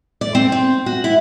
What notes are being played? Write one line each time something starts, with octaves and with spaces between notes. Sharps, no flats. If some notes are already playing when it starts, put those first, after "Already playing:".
D5
C4
C4
F#4
E4